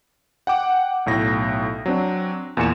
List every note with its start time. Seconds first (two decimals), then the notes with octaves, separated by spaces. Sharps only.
0.47 F#5 G5 D6
1.06 B1 A2 A#6
1.86 F#3 C4 D4
2.57 E2 A#2 G#5 C#7 E7